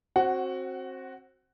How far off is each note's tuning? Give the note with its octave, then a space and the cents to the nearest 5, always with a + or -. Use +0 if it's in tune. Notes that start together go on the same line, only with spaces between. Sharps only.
C4 +25 F#4 +0 F#5 +20